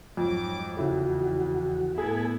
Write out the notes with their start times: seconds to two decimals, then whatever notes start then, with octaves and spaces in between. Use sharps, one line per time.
0.17 F2 G#2 F#3 D6
0.77 E2 C#3 E4 F#4 A4
1.98 A2 B3 E4 G#4 A4 G#5